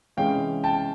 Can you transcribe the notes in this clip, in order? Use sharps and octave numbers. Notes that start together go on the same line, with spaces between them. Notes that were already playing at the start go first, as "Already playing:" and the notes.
C3 E3 G#3 C#4 F5 G5
G5 A5